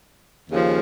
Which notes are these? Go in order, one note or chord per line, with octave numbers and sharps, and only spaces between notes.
D#2 C#3 F3